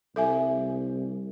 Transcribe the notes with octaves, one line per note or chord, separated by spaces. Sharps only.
C2 A4 E5 G#5